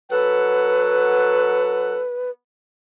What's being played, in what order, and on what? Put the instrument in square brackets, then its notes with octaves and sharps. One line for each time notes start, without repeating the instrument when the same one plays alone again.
[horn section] F#3 A4 F#5 [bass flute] B4